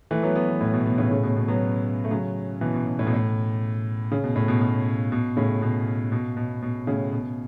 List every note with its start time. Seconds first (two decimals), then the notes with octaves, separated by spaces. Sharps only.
0.11 E3 A3
0.23 F#3 B3
0.36 F#3 B3
0.48 E3 A3
0.61 A2
0.73 B2
0.86 B2
0.98 A2 C#3
1.11 A2 C#3
1.23 B2
1.36 B2
1.48 F#3 B3
2.04 A3
2.11 C#3 F#3
2.61 B2 E3
2.74 B2
2.87 B2
2.99 A2
3.07 B2
3.14 A2
4.12 C#3
4.24 B2
4.36 A2
4.48 B2
4.61 B2
5.12 B2
5.37 A2 C#3
5.62 B2
6.12 B2
6.37 B2
6.62 B2
6.87 A2 C#3
7.12 B2